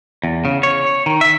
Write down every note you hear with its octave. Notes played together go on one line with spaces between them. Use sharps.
E2
C#3
C#5
D#3
E5